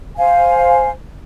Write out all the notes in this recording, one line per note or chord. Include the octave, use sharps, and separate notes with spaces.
C5 F5 G#5